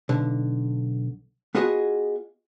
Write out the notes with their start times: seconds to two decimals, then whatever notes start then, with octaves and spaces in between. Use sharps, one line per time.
0.09 B1 D3
1.55 B3 F4 F#4 G#4 D#5 G#5